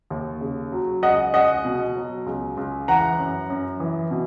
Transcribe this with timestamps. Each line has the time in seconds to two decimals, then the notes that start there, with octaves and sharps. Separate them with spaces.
0.10 D#2
0.41 C#3
0.72 F#3
1.03 C#2 D#5 F#5
1.34 C#2 D#5 F#5
1.65 B2
1.96 F#3
2.26 C#2
2.57 C#2
2.88 E3 F#5 A#5
3.19 F#2
3.50 F#2
3.80 E3
4.11 B2